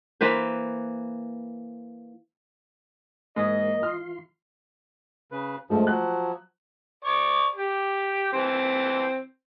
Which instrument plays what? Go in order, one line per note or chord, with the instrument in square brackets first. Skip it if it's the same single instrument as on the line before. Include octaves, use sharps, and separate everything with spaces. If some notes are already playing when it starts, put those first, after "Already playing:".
[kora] E3 A#3 B4 C5
[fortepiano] G#2 [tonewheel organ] E3 A#3 [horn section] D#5
[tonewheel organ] E3 F4 C6 [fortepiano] F6
[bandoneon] C#3 B4
[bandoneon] G2 F3 [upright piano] G#3 A3 C5
[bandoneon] F3 F#3 [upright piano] F#6
[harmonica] D5 C#6
G4
E3 C4